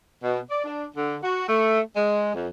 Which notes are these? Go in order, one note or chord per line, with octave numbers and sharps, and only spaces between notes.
B2
D5
D4
D3
F#4
A3
G#3
F2